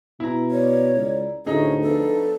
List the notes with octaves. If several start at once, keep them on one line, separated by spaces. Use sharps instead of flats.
B2 E4 A#5
C#5 D5
C#2
D2 A2 C#4 D#4 G#4 D#5
F3 B3 D4 A4